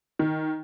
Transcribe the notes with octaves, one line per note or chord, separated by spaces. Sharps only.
D#3